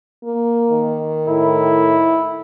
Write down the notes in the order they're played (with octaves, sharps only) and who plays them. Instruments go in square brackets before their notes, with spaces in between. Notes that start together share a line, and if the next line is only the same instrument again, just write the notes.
[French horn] A#3
[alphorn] D#3
[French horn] A2 [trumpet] E4